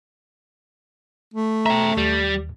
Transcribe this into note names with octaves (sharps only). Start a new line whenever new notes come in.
A3
E5 G5 A#5
D#2 G3